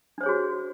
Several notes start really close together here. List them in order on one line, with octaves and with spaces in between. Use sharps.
D4 C5 C#5 G#4 F#4